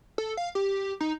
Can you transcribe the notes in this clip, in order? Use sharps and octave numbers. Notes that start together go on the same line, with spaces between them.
A4
F5
G4
D#4